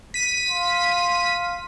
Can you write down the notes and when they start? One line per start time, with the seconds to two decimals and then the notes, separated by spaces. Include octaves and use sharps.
0.14 B6 D#7
0.49 F5 C6